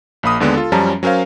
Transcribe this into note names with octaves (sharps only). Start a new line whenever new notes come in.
A#1 A#3 B5 D#6
D#2 D3 G#3 B3 D4
F4 A4
F#2 F3 G3 C#4 A5 A#5
F#3 C#4 A#4 C5 F5